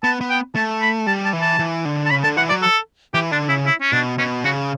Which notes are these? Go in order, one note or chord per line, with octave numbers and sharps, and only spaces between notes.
B3 A5
B3
G5
A3 A5
B5
G3 A5
A5
E3
A5
E3
D3
A5
C#3 B5
D3 A5
E3 F#5
F#3 D5
A4
E3 G4
D3 D4
C#3 E4
E4
C#4
B2 D4
B2 C#4
C#3 F#4